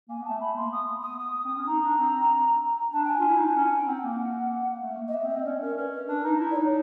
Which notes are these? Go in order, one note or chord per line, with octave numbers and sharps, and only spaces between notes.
A#3 G#5
B3
A3 A5
A3 B5
A#3 C6
B3 D#6
D#6
D#6
C4
C#4
D#4 A#5
D4
C4
D4 A5
G5
G#5
F4
E4
D#4
D4
C#4
G#5
G5
C4 F#5
A#3
A3
A#3
D#5
B3 E5
C4
D#5
C4
C#4 D5
C#4 A#4
C#4 B4
B4
D4 B4
A#4
D#4 B4
E4
D5
D#4 C#5